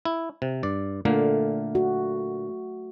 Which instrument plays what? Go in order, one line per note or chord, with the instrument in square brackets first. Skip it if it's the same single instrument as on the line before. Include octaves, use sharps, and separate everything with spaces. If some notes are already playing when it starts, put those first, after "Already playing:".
[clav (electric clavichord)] E4
C3
G2 D5
[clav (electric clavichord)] A#2 D3 A#3 [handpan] A3
[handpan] F#4